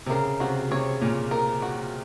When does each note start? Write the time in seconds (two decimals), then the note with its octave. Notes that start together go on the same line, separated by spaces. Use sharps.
0.06 C3
0.10 C#3 A#4
0.40 C3 F#4
0.71 C3 C#5
1.01 A#2 C#4
1.31 A#4
1.62 F#4